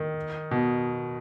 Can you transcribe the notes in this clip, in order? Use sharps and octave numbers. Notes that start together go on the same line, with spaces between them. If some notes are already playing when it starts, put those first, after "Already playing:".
Already playing: D#3
B2